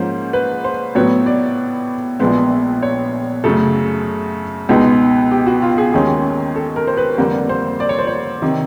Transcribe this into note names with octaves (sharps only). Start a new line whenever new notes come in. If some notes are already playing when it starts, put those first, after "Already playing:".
Already playing: G#2 F3 A#3 C#4 C5
B4
C5
A2 F#3 B3 C#5
D5
A#1 A#2 F3 G#3 B3
C#5
F#2 C#3 F#3 A3 A4
C#2 B2 G#3 B3 D#4
G4
F#4
F4
G#4
D#2 D#3 G#3 C#4 G#4
A4
A#4
C5
B4
F2 D3 G3 A#3
C5
D5
C#5
C5
C#5
C3 D#3